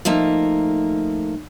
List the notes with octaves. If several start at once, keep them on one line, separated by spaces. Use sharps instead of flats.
F3 A3 A#3 D#4